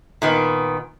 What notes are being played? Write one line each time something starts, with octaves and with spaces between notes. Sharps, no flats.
A#2 D#3 B3